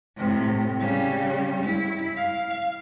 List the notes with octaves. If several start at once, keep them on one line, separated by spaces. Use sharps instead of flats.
A2 C3
C#3 G3
E4
F5